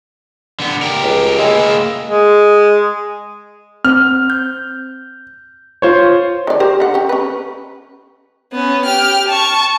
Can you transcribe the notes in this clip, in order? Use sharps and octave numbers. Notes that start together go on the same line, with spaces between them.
D3 B3
G4 A#4
C#2
G#3 A#3 E4
G#3
C4 C5 F6
G6
F4 C5 C#5
D#3 D5
G4 A#4 C5
D3 F#5
C#4 G4
C#4 B4
B3 C#4
G4 F6
A5 C#6